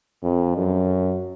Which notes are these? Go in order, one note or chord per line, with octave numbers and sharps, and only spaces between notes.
F2
F#2